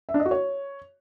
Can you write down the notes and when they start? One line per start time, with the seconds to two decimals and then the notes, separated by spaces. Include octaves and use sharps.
0.09 E5
0.14 D4
0.20 D#5
0.25 F#4
0.31 C#5